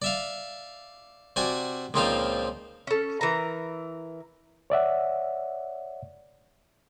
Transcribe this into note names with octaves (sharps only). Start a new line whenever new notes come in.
D5 E5 F5
C3 F#4 D5 G#5
C#2 A#2 F3 C4 D#4 F5
C#4 A4
E3 A#4 A#5
C#5 D5 E5 F#5